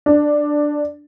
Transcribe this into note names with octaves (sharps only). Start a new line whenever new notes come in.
D4